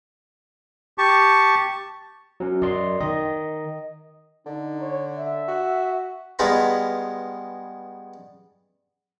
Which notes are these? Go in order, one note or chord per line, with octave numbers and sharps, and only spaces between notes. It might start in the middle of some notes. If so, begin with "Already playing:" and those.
G4 A5 C#6
F#3 C#4
F#2 D5 D#5 C6
D#3 D#5
D3 D#4
C#5
E5
F#4
G2 G#3 B3 F4 A#5 B5